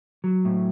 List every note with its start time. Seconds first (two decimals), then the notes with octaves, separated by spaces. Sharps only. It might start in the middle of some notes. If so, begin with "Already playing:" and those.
0.24 F#3
0.45 A2